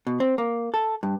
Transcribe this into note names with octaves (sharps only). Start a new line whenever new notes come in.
B2
C4
A#3
A4
G2